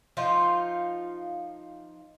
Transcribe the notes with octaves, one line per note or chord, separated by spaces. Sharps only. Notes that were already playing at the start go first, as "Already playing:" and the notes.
F3 D#4 F4